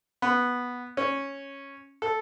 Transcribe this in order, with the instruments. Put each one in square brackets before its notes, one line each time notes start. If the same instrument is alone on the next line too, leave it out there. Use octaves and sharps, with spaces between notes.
[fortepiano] B3
C#4
A4